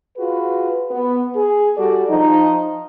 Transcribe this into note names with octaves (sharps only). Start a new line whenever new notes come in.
F4 F#4 G#4 B4
B3
G#4
G3 F#4 A4 D5
F3 D#4